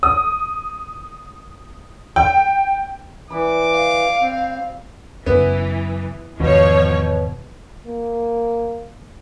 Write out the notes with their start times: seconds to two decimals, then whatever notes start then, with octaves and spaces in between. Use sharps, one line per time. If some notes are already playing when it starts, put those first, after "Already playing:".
0.03 D#6
2.16 G5
3.30 E3 D5 B5 D6
3.72 F5
4.21 C4
5.26 F#2 C#3 E3 F#3 B3
6.40 E2 G#2 B2 D#3 F3 C#5
7.86 A#3